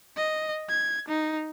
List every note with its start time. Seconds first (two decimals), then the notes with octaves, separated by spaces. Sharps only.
0.17 D#5
0.69 G#6
1.08 D#4